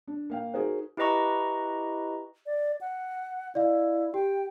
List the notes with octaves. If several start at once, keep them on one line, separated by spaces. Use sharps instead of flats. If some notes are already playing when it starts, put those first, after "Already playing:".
D4
A#3 F5 G5
D#4 F#4 G#4 A#4 C5
E4 G4 B4 D#5 A#5 C#6
D5
F#5
E4 D5 D#5 F5
G4 G5